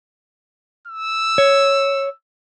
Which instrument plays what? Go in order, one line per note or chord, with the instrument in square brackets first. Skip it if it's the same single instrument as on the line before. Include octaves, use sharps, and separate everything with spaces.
[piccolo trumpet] E6
[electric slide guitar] C#5